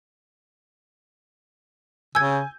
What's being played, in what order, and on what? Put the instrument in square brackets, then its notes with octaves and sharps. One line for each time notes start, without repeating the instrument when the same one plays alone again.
[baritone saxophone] C#3 [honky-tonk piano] G#5 G6 [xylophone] E6 G#6